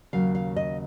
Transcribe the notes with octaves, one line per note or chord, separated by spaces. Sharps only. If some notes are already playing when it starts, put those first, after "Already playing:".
D#2 C#3 F#3 F5
F5
D#5